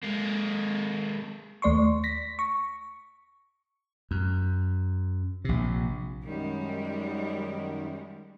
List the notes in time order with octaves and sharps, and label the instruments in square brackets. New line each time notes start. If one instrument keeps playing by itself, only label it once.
[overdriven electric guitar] G#3 A#3
[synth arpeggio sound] D#2 A3 D5 C6 C#6
A#6 B6
C#6
[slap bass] F#2
A#1 C3
[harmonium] F#2 D#3 [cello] G3 G#3